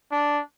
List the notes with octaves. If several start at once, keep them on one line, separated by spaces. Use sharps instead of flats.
D4